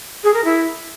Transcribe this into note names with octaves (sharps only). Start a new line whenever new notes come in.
G#4
A#4
E4